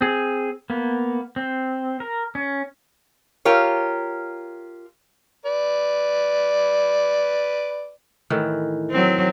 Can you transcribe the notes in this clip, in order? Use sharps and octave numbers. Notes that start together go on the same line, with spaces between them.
C4 G#4
A#3 B3
C4
A#4
C#4
F4 G4 A#4 C#5
B4 D5
A2 D#3 E3
F#3 C4